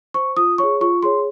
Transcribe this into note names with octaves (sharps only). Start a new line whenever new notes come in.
C5 C#6
F4 D#6
G#4 C#5 C#6
F4 C#6
G#4 C#5 C6